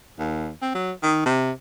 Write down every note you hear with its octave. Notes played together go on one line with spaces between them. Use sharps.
D#2
C4
F#3
D#3
C3